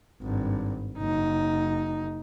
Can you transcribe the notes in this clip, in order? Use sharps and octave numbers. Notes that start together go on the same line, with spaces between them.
G#1 G2
F#1 D#4